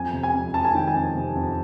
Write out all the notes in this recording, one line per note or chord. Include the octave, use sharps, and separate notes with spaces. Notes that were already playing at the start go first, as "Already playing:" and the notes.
Already playing: F2 G#5
C3
G#5
F2
F2 A5
G#5
D#3 G5
G#5
F2
C3
F2